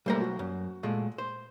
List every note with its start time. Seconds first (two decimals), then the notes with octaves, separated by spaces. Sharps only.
0.06 B1 G3 A3 A#3 C5 A#5
0.21 F#4
0.39 F#2
0.83 A#2 G#3 A3
1.18 C5